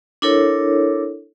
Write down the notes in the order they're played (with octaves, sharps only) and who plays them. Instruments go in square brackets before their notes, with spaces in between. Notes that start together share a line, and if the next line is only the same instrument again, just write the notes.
[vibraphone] D4 E4 A4 A#4 C#5